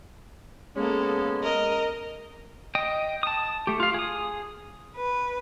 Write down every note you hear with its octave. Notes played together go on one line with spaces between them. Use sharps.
G#3 A#3 B3 C#4 A4
A#4 D#5
D#5 G5 D#6
A5 D#6
A3 G4
F4 F5
G#4 D#6
B4